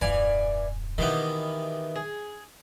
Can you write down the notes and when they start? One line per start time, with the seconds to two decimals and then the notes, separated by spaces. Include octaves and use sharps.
0.01 D#1 F#2 E3 D5 F5 G#5
0.98 B2 D#3 E3 A#3 B3 D4 G4
1.96 G#4